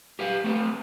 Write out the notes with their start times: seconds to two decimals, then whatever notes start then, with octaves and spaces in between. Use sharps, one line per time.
0.19 G4 B4 F5
0.44 A3 C4 B4